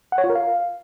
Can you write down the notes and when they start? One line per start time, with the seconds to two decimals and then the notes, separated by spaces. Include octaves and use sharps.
0.12 F#5
0.18 C#5
0.24 F4
0.30 A#4
0.35 F5